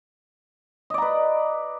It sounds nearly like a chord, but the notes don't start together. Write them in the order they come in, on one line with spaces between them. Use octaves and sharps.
D#5 D5 A#5 B4